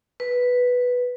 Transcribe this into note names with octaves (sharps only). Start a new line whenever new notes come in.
B4